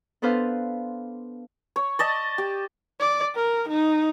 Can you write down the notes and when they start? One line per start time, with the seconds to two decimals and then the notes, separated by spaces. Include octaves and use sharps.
0.22 B3 D4 A4 B4 C5 F5
1.76 C#5
1.99 D5 D#5 A5
2.38 G4
3.00 D5
3.35 A#4
3.68 D#4